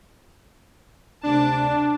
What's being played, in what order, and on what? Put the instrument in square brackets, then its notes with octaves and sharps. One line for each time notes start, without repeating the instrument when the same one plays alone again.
[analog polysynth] D2 C3 D6 [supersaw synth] D4 [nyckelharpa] A5